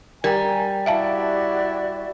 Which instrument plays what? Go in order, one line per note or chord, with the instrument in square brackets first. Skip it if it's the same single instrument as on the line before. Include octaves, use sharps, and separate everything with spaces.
[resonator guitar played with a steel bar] G3 [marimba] A#4 G5 [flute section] G#5 A#5
[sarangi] E4 [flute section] F#4 G4 D5 [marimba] E5 F5 A5